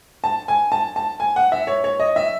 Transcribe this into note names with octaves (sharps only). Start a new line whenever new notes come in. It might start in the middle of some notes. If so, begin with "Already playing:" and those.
A5
G#5
A5
A5
G#5
F#5
E5
C#5
C#5
D#5
E5